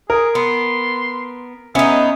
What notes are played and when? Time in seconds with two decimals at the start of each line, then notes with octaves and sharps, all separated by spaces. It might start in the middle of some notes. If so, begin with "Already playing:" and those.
0.10 G#4 A#4
0.35 B3 C6
1.75 B3 C#4 D#4 G#4 E5